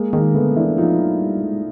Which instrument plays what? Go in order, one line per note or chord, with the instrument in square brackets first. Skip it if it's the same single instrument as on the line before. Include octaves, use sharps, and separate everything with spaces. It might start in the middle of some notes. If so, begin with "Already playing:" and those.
Already playing: [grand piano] G#3 A#3
[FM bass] D#3 [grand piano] G#3 A#3
[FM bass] D3 [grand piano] A3 B3
[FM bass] E3 [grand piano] D4 E4
[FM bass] F3 [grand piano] D#4 F4
[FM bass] F#3
G3
G#3